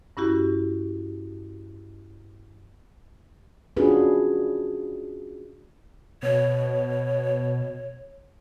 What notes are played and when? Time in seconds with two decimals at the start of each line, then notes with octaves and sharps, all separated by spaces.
0.17 G2 C#4 E4 F#4 G4
3.77 C#4 D4 F4 F#4 G#4 B4
6.23 B2 C#5